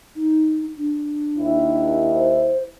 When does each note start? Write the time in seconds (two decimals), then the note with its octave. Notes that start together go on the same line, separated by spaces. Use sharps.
0.16 D#4
0.77 D4
1.38 D#2 E4
2.15 C5